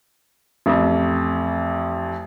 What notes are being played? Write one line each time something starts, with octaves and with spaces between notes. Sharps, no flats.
A1 F2